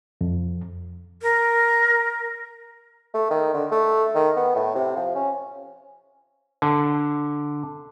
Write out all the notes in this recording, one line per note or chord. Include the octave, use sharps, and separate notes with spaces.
F2
A#4
A3
D#3
D3
A3
D#3
B3
A2
C3
F3
C#4
D3